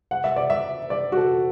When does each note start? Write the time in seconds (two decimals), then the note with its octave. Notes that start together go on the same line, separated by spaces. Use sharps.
0.11 F#5
0.24 E5
0.36 D5
0.50 E5
0.90 D5
1.12 F#4
1.17 A4